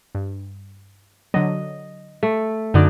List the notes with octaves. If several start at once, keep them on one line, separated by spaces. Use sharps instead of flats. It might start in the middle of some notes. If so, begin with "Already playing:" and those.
G2
D3 F#3 D#5
A3
F#2 D3 F#3 D#4 D5